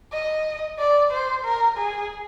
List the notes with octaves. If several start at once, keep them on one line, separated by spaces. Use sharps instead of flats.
D#5
D5
C5
A#4
G#4